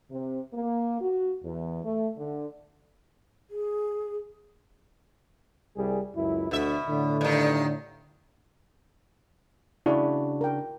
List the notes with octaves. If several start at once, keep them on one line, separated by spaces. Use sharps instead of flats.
C3
A#3
F#4
E2
A3
D3
G#4
C2 G3 G#4
C#2 F#2 E4
D2 B2 E5
A2 D3
G2 D#3
C#3 D4 E4 F#4 D5
A#4 G5